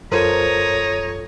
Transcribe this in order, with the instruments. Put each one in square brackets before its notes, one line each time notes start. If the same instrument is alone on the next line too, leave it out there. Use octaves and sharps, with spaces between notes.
[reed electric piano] F#2 F4 A4 [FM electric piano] A#4 C5 [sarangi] C#5 [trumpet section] A#5 D#6